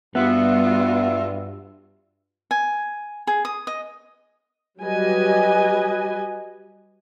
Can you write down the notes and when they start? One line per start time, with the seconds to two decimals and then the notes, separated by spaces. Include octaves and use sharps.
0.15 G2 G3 B3 F4 F#4 E5
2.51 G#5
3.27 G#4
3.45 D#6
3.67 D#5
4.80 F#3 G3 G4 B4 D#5 G#5